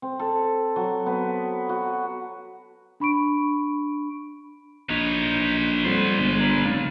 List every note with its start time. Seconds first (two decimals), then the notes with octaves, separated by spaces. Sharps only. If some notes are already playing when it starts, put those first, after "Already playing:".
0.02 C4
0.19 A4
0.76 F#3
1.06 B3
1.69 F#4
3.00 D4 B5 C#6 D7
4.89 A#1 D#4 B4 C#5
5.85 F2 G3 B3 C5
6.19 G1 G#3
6.39 G#4 A#4
6.65 F1 C#3 F4